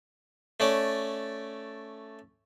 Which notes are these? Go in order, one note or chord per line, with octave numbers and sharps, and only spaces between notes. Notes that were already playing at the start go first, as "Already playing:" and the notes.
A3 C#4 D5